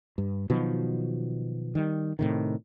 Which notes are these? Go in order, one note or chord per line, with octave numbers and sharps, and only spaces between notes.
G2
B2 D#3 F3 F#3
D#3 G3
A2 C3 D#3